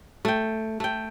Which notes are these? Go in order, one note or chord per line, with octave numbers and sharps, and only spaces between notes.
A3 G5
A3 G5